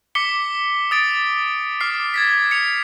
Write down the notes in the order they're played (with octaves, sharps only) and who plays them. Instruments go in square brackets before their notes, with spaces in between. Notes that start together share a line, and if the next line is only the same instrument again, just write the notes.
[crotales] D6 B6 C#7 G7
D#6 A6 D7
D6 F6 C7
G#6 A6 B6
C#7 F7